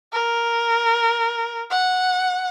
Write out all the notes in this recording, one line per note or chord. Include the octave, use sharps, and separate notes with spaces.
A#4
F#5